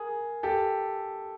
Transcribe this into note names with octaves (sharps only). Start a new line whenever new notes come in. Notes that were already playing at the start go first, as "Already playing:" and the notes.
Already playing: G#4 A#4
G4 A4